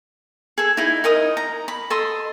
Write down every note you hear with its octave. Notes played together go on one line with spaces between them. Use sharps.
G#4 A4
D#4 E4
D#4 A#4 D#5 D#6
A#5
B5
A4 D#5 C6